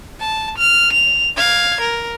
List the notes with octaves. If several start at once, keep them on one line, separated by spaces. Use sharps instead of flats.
A5
F6
F7
F5 G#6
A#4